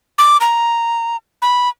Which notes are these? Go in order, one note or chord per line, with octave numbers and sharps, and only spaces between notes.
D6
A#5
B5